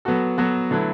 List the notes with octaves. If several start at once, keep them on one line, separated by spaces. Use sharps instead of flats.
F#3 B3 F#4 A4
F#3 B3 F#4 A4
D3 F#3 A3 E4 B4